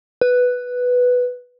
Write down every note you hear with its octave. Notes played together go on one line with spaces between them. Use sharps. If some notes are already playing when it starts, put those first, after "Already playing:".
B4